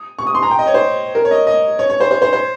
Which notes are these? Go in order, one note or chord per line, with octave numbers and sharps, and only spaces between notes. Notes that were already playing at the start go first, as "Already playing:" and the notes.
Already playing: D#6
C#6
D#6
C6
A#5
G5
D#5
C#5
C5
A#4
C#5
D#5
D#5
C#5
C#5
C5
C5
C5
C5